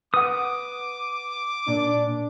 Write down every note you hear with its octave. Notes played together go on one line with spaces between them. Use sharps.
B4 F#5 D6 D#6
A#2 D4 D5